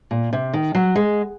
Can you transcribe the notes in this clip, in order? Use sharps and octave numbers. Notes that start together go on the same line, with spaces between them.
A#2
C3
D#3
F#3
G#3